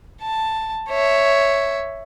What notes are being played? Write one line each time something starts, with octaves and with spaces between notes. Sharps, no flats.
A5
C#5 E5